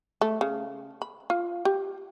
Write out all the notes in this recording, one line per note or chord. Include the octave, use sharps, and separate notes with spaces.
A3
C#3
B5
F4
G4